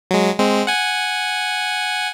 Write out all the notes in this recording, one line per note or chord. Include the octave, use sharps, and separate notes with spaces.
F#3 G#3
G#3 C4
F#5 G#5